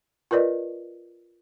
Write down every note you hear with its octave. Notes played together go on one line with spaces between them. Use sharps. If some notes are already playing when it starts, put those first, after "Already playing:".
F4 A#4 B4 D5 D#5